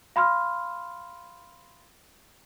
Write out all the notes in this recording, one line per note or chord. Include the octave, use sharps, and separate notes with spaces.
F5 B5 C6 F6